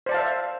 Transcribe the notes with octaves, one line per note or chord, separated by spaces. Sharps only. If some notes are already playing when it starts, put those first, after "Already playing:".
C5 D5 E5 F5 A5